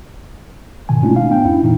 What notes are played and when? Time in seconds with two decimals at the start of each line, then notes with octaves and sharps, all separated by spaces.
0.89 G#2 B2 D#3 G#5
1.03 G#3 A3 C#4 D4 E4 F4
1.16 F5
1.30 B3 D4 G5
1.45 F2 C#4 E4
1.63 A#2 E3 D#4